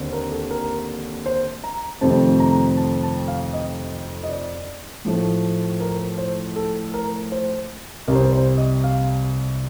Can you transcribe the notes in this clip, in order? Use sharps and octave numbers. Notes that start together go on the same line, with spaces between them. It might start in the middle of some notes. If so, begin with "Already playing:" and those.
Already playing: D#2 D3 C4
A#4
A4
A#4
C5
A#5
F2 C3 D#3 A3 C4 A5
A#5
A5
A5
F5
D#5
D#5
D5
A2 F3 A3
A#4
C5
A4
A#4
C5
C2 C3 G3 A#4
C5
A#4
C5
D#5
F5